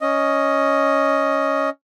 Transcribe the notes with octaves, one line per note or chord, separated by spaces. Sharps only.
C#4 D#5